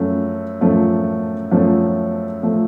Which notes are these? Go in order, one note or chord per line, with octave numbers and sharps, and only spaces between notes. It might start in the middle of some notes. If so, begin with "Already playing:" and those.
Already playing: F#2 F3 A3
F#2 F3 A3
F#2 F3 A3
F3 A3